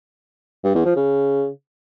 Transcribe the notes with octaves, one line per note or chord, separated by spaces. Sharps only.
G2
E2
F3
C#3